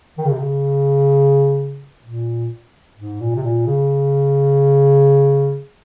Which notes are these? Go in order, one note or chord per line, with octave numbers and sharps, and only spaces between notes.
D#3
C#3
C3
C#3
A#2
G#2
A#2
C3
A#2
C#3